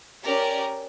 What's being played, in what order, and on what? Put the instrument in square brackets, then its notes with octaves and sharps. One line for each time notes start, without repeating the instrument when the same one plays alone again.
[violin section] C#4 G4 A#4 D5